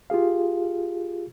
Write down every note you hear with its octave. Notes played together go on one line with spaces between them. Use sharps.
F4 G4 G#4 F5